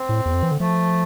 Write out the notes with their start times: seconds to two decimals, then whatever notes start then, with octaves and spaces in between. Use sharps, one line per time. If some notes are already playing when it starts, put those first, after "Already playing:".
Already playing: C4
0.09 A2
0.25 E2
0.34 F2
0.43 E3
0.51 D3
0.60 F3 A3